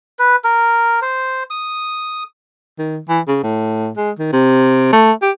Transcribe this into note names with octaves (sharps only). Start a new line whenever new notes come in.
B4
A#4
C5
D#6
D#3
E3
C#3
A2
G#3
D#3
C3
A3
G4